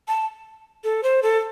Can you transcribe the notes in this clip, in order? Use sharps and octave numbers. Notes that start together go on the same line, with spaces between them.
A5
A4
C5
A4